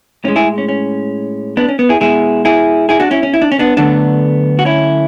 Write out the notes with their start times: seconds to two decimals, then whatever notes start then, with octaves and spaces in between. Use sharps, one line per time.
0.24 A2 G#3 C#4
0.36 E4 G#4
0.58 C#4
0.69 C#4
1.57 B3 D4
1.68 C#4
1.79 B3
1.89 E4 G#4
2.01 B2 G#3 E4 G#4
2.45 E4 G#4
2.89 E4 G#4
3.00 D4 F#4
3.11 C#4 E4
3.23 C#4
3.34 E4
3.42 D4
3.52 C#4
3.59 B3 D4
3.77 D3 F#3 A3 B3 D4
4.59 F#4
4.65 C#4 E4